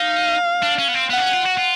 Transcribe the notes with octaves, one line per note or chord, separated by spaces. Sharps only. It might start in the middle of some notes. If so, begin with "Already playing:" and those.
Already playing: D#4 F5
D4
C#4
B3
C4
B3 F#5
D4
C#4
F4
F#4
F4